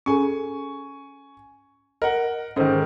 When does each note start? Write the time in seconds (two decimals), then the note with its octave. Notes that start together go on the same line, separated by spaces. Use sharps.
0.06 C#4 G#4 A4 G#5 C#6
2.02 A#4 D#5 F#5
2.56 G#2 D#3 C#4 A4 C5